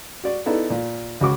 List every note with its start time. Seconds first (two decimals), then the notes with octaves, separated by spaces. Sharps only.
0.24 F#4 D5
0.46 B3 D#4 E4 A4 D5
0.70 A#2
1.21 C#2 F#4 D6